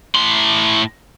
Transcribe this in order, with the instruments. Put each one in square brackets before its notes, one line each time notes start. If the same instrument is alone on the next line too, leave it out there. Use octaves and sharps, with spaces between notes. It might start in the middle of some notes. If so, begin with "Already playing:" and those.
[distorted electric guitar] A2 C6